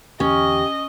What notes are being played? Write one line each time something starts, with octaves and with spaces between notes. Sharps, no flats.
E2 D3 C#4 G4 D#5